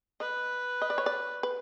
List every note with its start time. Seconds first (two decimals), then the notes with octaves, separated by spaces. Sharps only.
0.20 B4 D#5
0.82 D#5
0.90 D5
0.98 C#5
1.06 D5
1.43 B4